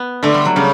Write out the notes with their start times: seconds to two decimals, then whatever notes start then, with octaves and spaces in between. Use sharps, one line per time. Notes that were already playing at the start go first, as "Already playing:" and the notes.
Already playing: B3
0.23 D3 A3
0.34 G3
0.45 F#3
0.56 C#3 G3